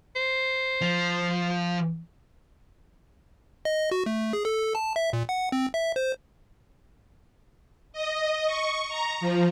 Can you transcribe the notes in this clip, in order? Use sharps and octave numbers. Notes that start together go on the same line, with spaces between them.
C5
F3
D#5
F#4
A3
G#4
A4
A5
E5
A#2
F#5
C4
E5
C5
D#5
C#6
A#5
F3